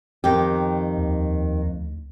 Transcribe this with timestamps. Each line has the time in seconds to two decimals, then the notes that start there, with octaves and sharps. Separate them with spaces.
0.24 F2 D#3 G4
0.97 D#2
1.66 D2